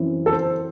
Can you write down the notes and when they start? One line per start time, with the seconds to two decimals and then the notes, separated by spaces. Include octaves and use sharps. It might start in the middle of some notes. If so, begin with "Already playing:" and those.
Already playing: F#2 E3 C4
0.26 A4
0.33 C5